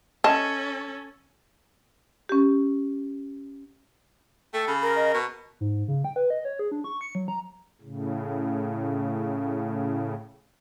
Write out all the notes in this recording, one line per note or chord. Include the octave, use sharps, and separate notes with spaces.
C#4 A4 D#5 A5
C#4 G4
A3 A4 G5
C#3 B5
A#4
D#5
B2 C#6
G#2
C#3
G5
B4
D#5
C#5
G#4
D4
C#6
C#7
F#3
A#5
A2 C#3